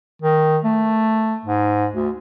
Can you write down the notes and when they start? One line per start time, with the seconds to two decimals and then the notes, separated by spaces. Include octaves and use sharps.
0.22 D#3
0.64 A3
1.45 G#2
1.94 D2